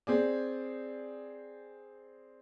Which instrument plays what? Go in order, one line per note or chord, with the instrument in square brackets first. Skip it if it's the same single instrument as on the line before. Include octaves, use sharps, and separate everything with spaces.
[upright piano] C4 G#4 D5